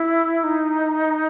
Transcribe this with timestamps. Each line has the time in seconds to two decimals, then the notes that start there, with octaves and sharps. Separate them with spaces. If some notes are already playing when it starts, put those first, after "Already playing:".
Already playing: E4
0.44 D#4